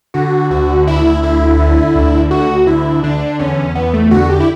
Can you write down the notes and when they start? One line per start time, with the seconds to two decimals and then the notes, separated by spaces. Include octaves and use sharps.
0.14 D3 F#4
0.50 D2 F#4
0.87 D2 E4
1.23 D3 E4
1.59 D3
1.95 D2
2.31 D2 F#4
2.67 D3 E4
3.04 D3 D4
3.39 E2 C#4
3.75 E2 B3
3.94 A3
4.11 D3 F#4
4.30 G4
4.40 E4